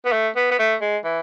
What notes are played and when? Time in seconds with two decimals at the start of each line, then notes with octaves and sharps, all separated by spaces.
0.06 B3
0.12 A3
0.36 B3
0.51 B3
0.59 A3
0.81 G#3
1.05 E3